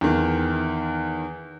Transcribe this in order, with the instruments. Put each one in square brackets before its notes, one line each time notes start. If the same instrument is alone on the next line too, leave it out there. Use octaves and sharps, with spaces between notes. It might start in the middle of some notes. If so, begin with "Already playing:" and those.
[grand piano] E2 D#3